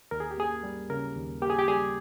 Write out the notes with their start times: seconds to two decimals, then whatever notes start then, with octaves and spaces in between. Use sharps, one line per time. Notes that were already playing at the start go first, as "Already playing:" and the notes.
0.11 D#2 A#4
0.20 G#4
0.31 G4
0.38 A#3 G#4
0.63 G3
0.90 C#3 A#4
1.16 D#2
1.42 A#3 G4
1.50 G#4
1.59 G4
1.68 G3 G#4